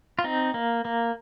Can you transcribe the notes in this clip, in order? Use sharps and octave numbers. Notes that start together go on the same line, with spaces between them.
F4
C4 D#4
A#3
A#3